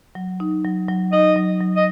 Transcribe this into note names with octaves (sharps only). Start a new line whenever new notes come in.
F#3
D#4
F#3
F#3
D#4 D#5
F#3
F#3
D#5